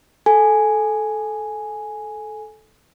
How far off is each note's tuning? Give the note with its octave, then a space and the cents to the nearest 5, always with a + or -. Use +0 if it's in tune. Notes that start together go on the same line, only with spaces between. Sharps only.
A4 -15 G#5 +0